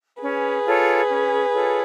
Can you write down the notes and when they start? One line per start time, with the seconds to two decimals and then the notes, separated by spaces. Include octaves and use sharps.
0.23 C#4 G#4 B4
0.66 F4 A4 C#5
1.09 C#4
1.53 F4 A4 C#5